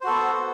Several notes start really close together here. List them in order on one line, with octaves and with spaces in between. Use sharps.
C5 F#4 A4 B3